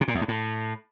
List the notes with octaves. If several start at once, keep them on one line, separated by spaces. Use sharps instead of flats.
C3
A#2
E2
G2
A2